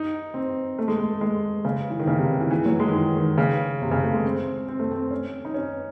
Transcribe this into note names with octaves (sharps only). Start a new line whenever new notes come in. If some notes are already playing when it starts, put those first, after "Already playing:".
Already playing: D#4
C4
A3
G#3
A3
G#3
C#3
E3
D#3
C#3
C3
E3
E3
F#3
G#3
D#3
E3
D#3
C#3
C3
C#3
A3
G#3
C4
C4
A3
C4
C#4
D#4
C#4